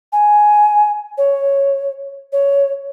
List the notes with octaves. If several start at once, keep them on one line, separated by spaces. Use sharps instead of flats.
G#5
C#5
C#5